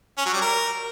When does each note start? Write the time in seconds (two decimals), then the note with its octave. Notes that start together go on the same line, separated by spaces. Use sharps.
0.18 C#4
0.26 F#3
0.33 G3
0.41 A#4